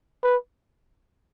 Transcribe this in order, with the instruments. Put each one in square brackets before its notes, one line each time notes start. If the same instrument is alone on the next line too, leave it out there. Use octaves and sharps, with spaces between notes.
[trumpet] B4